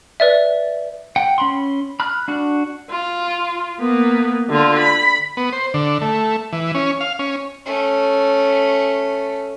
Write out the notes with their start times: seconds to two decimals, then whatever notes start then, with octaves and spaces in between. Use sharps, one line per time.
0.20 B4 D5 E5
1.16 F#5 G5
1.38 C#4 B5 C6
2.00 B5 F6 F#6
2.28 D4 F#4 F#6
2.90 F4
3.80 A#3 B3
4.49 D3 F4
4.79 B5
5.37 B3
5.52 C5
5.74 D3
6.01 A3
6.53 E3
6.75 C#4
7.01 F5
7.19 C#4
7.66 A3 C#4